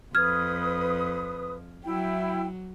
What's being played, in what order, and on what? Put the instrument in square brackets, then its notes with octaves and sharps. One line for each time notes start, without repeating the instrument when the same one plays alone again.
[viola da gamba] F2 [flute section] B4 D#6 [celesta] F6 G#6
[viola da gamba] F#3 [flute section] E4 G5